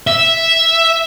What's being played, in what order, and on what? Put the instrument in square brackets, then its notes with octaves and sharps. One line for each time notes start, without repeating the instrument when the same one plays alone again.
[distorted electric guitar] E5